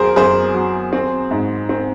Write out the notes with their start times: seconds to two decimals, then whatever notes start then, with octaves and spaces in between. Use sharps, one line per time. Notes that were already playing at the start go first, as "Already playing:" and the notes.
Already playing: F#2 F#3 G#4 A#4 C5
0.16 F#2 G#4 C5
0.54 F#3
0.93 C4
1.31 G#2
1.69 C4